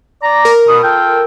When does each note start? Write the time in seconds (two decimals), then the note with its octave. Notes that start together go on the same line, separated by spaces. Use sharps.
0.23 D5 A#5
0.45 A#4
0.68 B2 D#6
0.83 F4 A4 G5